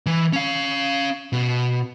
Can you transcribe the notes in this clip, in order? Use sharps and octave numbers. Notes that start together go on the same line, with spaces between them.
E3
C#4 F5
B2